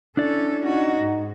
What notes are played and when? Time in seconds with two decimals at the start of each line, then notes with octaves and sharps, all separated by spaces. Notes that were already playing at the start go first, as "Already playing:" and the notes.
0.17 C#4 D4 E4 A4 D5
0.63 C#4 D#4 F#4
1.01 G#2